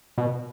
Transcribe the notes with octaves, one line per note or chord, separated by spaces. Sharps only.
B2